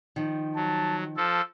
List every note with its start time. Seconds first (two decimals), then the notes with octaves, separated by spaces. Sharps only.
0.16 D#3 F3
0.56 F#3 A5
1.17 F3 A4 E6